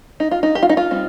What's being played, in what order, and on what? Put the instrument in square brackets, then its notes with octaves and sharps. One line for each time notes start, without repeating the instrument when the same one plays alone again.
[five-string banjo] D#4
F4
D#4
G4
F4
D#4
F4
G3 C4 D#4